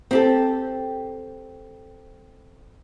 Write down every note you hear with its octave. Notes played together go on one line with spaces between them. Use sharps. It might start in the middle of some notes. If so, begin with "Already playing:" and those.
C4 G4 A4